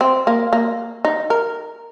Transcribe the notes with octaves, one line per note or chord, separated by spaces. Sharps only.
C4
A#3
A#3
D#4
A#4